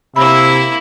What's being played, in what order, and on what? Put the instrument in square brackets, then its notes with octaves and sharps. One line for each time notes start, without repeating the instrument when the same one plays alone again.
[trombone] C3 [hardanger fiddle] A#3 E4 [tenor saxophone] E5 [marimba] B5